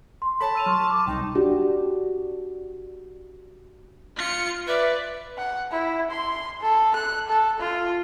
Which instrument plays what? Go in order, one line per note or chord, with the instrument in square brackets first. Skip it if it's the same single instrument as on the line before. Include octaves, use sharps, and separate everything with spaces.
[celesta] C6
[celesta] A4 C#5 [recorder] A5 [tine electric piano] B5
[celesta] E6 D#7 F7
[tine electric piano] F#3 [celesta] C6 C#6 F6
[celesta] D6
[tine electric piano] C2 [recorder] D#4 [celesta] G5
[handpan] D4 F#4 G4
[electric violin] F4 C#7
[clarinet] B4 [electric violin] D5 [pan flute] E5
[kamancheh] F#5
E4
C6
A4
F#6
A4
F4